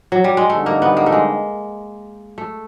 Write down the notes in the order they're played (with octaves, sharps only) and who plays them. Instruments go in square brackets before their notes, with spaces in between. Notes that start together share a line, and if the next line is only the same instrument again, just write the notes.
[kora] F#3
G3
G#3
[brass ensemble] D3 G3 C4 D#4 G4 [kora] A3
[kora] A#3
B3
A#3
A3
G#3
A3